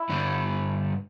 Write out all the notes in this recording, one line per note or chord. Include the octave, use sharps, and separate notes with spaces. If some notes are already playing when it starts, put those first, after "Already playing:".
Already playing: E4
G2 D3 G3